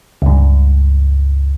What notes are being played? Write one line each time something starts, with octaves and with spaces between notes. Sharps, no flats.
C#2 G2